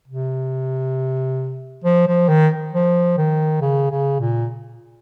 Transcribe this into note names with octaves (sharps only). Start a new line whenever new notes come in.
C3
F3
F3
D#3
F3
D#3
C#3
C#3
A#2